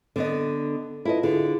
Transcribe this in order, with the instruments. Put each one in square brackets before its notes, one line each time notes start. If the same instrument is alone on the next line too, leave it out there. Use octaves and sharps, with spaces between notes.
[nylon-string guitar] D3 B3 D#5
[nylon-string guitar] E4 D#5 [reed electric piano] F4 A4 B4
[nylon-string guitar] D3 [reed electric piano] E4 F4 G#4